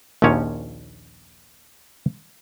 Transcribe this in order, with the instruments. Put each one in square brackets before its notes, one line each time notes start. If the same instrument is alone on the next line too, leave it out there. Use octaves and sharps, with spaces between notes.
[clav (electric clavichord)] A#1 D#2 A#2 F3 C#4 C#5